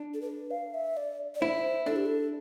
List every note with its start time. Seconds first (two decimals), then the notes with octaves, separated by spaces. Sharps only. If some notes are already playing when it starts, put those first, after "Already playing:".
Already playing: D4
0.14 A4
0.22 B4
0.51 F5
0.74 E5
0.97 D5
1.35 D5
1.41 E4 C5
1.86 D4 A4
1.96 G4
2.06 A4